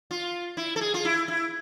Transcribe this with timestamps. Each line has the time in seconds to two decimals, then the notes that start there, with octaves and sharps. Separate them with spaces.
0.11 F4
0.57 E4
0.76 A4
0.81 G#4
0.94 F4
1.05 E4
1.28 E4